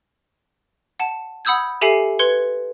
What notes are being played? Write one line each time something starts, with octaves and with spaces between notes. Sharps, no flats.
F#5 A5
F#5 B5 D#6 E6 G6 G#6
G4 A4 E5 G#5 C7 C#7
B4 C6 G#6 C#7 G7